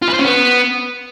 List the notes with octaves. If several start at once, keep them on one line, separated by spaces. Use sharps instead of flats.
F4
B4
C5
C#4
B3